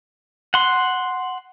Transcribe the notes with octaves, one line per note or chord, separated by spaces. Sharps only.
F#5 C6